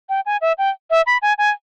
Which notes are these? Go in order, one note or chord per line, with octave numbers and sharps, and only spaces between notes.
G5
G#5
E5
G5
E5
B5
G#5
G#5